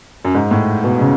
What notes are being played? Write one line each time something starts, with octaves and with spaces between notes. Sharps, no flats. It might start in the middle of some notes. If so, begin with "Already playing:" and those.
F#2
G#2
A2
B2
C#3